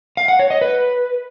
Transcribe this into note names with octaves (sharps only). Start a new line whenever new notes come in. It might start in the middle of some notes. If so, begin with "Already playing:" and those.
F5
F#5
C#5
D#5
B4